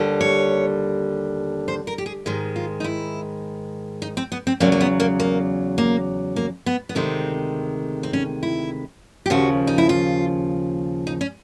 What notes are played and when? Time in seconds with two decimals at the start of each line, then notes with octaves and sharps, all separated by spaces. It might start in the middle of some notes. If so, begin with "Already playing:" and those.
Already playing: D#2 D3 G3
0.21 C#5
1.68 C5
1.87 A#4
1.98 G4
2.06 G#4
2.26 G#2 D#3 G#3 G4
2.56 F4
2.80 D#4
2.84 E4
4.02 D#4
4.17 C4
4.32 B3
4.47 C4
4.60 E2 C#3 F#3 A#3 C4
4.72 A#3
4.81 B3
5.00 A#3
5.20 A#3
5.78 A#3
6.36 A#3
6.66 B3
6.89 B3
6.95 D2 C3 D#3 G#3 C4
8.03 C4
8.13 C#4
8.43 E4
9.26 G4
9.30 D#2 C#3 F3 F#4
9.67 D#4
9.78 E4
9.89 F4
11.07 D#4
11.21 C#4